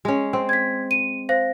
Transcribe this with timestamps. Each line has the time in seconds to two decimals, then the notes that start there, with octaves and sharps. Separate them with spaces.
0.05 G#3 C#4
0.33 C4
0.49 G#6 B6
0.91 D#7
1.29 C5 F5 A#6